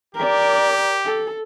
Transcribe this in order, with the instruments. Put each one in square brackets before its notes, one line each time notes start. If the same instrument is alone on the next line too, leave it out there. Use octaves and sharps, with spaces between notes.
[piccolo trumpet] G4 [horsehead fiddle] A#4 D5
[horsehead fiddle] A4